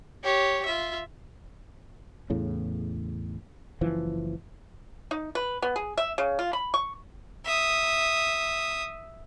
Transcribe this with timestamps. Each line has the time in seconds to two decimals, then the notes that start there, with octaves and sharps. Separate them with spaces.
0.23 G4 C#5
0.65 F4 E5
2.30 E2 A2 C#3
3.81 F#1 E3 F3
5.11 D#4
5.35 B4
5.62 B3
5.76 G#4
5.97 E5
6.18 C#3
6.39 F4
6.53 B5
6.74 C#6
7.45 E5 D#6